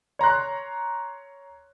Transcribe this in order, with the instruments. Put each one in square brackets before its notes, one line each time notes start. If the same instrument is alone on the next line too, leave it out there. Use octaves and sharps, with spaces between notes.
[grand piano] C#5 A#5 C6 F#6